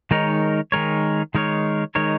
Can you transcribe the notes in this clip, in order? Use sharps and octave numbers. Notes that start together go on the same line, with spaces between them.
D#3 G#3 D#4 A#4 C#5
D#3 G#3 D#4 A#4 C#5
D#3 G#3 D#4 A#4 C#5
D#3 G#3 D#4 A#4 C#5